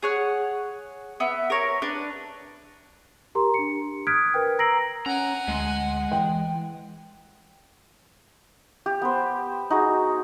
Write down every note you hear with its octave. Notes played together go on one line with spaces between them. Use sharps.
G#4 C#5 F#5
B3 E5
A#4 C#5
D4 B4
G4 A#4 A#5 C6
D4 C#7
D#6 F6 F#6 G#6 B6 D7
A#4 B4 G5
A#5 E6 A#6 C7 D7 F#7
C#4 F#5 G#5 A#5
D2 G#3
E3 G5
G4
B3 C5
D#4 F#4 G#4